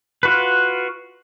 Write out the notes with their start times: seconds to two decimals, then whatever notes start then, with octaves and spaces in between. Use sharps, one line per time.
0.23 F4 F#4 B4